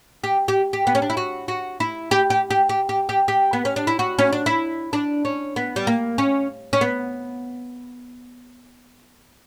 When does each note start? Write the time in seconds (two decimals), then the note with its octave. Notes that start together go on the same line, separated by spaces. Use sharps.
0.24 G4
0.48 G4
0.73 G4
0.87 B3
0.95 C#4
1.02 D4
1.10 E4
1.17 F#4
1.48 F#4
1.80 E4
2.11 G4
2.30 G4
2.50 G4
2.69 G4
2.89 G4
3.09 G4
3.28 G4
3.53 B3
3.65 C#4
3.76 D4
3.87 E4
3.99 F#4
4.19 C#4
4.33 D4
4.46 E4
4.93 D4
5.25 C#4
5.56 B3
5.76 G3
5.87 A#3
6.18 C#4
6.73 C#4
6.81 B3